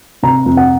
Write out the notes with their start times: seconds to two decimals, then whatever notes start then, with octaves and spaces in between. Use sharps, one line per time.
0.23 C3 A#5
0.46 F2
0.57 F#5